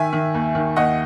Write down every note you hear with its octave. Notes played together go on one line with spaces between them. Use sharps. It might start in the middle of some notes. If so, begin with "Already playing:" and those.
Already playing: D#3 E5 G#5
D#3
D#2
D#3
D#2 D#5 F#5